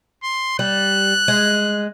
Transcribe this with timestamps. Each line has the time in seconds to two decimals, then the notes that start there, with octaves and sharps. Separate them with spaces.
0.23 C6
0.59 G3 F#6
1.28 G#3